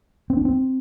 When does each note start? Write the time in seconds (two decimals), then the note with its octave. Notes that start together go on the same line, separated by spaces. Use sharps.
0.30 C4
0.37 D4
0.45 C4